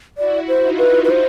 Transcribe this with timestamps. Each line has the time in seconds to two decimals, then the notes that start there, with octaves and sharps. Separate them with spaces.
0.18 E4 F#4 D5
0.48 C5
0.63 D#4 F4
0.79 B4
1.04 B4
1.10 C5